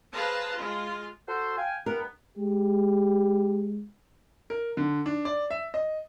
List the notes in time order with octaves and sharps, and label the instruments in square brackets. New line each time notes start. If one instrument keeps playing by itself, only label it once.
[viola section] G#4 B4 C5 F5 A5 A#5
G#3 F4
[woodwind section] F#4 A4 C5
F5 G5 G#5
[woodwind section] G2 B3 [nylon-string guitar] A#4
[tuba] G#3 [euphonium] G4
[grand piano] A#4
D3
D4
D5
E5
D#5